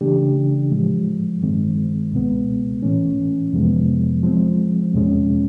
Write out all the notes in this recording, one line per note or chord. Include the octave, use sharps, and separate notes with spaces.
C#3 E3 A3 D4 G4
A2 F3 G#3
G2 D#3 G#3 C4
C#2 B2 G#3 B3
A2 E3 A3 C#4
F2 C3 F3 G#3 B3
F3 G#3 C4
E2 B2 G#3 C#4